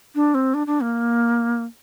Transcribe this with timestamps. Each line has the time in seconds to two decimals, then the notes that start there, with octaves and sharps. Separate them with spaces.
0.15 D4
0.34 C4
0.54 D4
0.67 D4
0.81 A#3